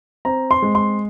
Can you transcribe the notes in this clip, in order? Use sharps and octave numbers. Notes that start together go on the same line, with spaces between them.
C4 A#5
C6
G#3
C6